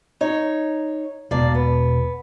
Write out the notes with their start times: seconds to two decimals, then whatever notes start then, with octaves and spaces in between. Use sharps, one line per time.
0.21 D#4 C#5
1.31 E1 B2 A#3 D4 D5
1.54 B3